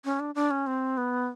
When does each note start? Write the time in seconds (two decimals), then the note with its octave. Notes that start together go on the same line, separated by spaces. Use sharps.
0.05 C#4
0.20 D4
0.35 D4
0.51 C#4
0.67 C4
0.97 B3